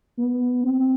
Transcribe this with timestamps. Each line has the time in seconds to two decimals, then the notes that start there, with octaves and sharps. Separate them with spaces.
0.18 B3
0.64 C4